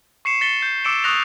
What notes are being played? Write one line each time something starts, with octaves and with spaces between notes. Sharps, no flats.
C#6 C7 C#7 E7
A6 B6 C#7 E7 G7
G6 C7
D6 E6 C#7 D7 E7
C#6 D#6 F#6 A#6 F7